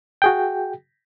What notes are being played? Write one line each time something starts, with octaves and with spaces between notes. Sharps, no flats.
F#4 G#4 G5